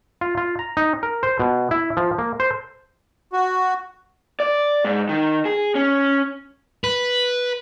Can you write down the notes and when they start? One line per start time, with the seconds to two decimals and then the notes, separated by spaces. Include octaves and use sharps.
0.21 F4
0.37 F4
0.59 A#5
0.77 D#4
1.03 A#4
1.23 C5
1.40 B2
1.71 E4
1.97 F3
2.18 A#3
2.40 C5
3.33 F#4
4.40 D5
4.84 G#2
5.09 D#3
5.45 G#4
5.75 C#4
6.84 B4